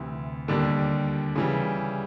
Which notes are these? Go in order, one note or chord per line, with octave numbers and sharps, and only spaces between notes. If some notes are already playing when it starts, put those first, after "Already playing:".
Already playing: D2 C3 E3
D#2 D3 G3 A#3 D4
C#3 E3 G3